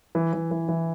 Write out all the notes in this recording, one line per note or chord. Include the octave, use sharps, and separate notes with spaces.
E3
E3
E3
E3